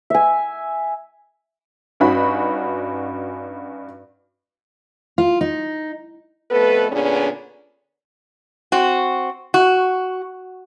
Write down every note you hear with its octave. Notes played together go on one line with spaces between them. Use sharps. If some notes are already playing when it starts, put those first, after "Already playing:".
E5 G#5
G2 C#4 D#4 F#4 B5
F4
D#4
F2 A3 B3 A4 B4
A#2 D3 B3 C#4 D4 G#4
C4 F#4
F#4